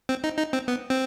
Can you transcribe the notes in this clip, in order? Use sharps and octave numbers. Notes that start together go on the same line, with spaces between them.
C4
D#4
D#4
C4
B3
C4